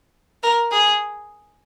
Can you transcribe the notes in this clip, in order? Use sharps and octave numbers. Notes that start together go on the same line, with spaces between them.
A#4
G#4